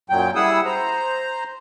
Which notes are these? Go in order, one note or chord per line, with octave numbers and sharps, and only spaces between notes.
F#2 A#2 F#3 G5
G3 E4 G#4 F#5 D#6 E6
C5 A#5